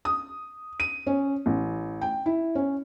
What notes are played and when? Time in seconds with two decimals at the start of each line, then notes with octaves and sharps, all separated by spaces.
0.05 D#6
0.80 D#7
1.07 C#4
1.46 A1
2.01 G5
2.26 E4
2.55 C#4